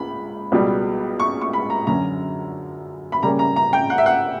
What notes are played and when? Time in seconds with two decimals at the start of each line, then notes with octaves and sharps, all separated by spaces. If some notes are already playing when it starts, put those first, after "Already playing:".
Already playing: C#2 B5
0.52 C#2 B2 G3
1.20 C#6
1.42 C#6
1.53 B5
1.70 A#5
1.87 F#2 D3 F#3 C#4 A#5
3.12 B5
3.22 C#3 G3 A#3 C#4 A#5
3.39 A#5
3.56 A#5
3.73 G5
3.90 F#5
3.98 E5
4.06 F#5